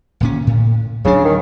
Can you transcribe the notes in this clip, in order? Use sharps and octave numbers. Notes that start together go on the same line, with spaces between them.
D1 A#2 C#4
A2
D1 C#3 F#3 D4
D#3